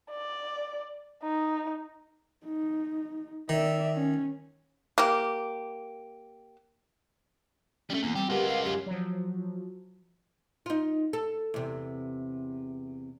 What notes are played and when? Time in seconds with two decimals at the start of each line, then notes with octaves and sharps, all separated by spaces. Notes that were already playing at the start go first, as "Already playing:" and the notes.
0.10 D5
1.23 D#4
2.45 D#4
3.49 D#3 D5 E5
3.96 C#4
4.98 A#3 G4
7.90 G3 A3 C#4
8.03 E2 A#3
8.15 G3 C4 G4
8.30 G#3 F4 G4 A#4 B4 F#5
8.48 F5
8.65 F#2 C#4 G4
8.86 F3 F#3
10.66 D#4 F4
11.13 A4
11.54 E2 C3